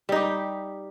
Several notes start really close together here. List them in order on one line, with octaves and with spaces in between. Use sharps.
G3 D#4 G4